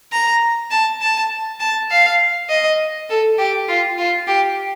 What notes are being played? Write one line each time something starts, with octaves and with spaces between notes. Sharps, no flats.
A#5
A5
A5
A5
F5
D#5
A4
G4
F4
F4
G4